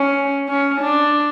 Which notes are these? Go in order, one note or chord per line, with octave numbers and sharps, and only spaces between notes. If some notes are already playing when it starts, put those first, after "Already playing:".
Already playing: C#4
C#4
D4